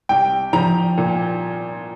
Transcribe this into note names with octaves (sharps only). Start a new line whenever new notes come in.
C2 G5
F3 A#5
A#2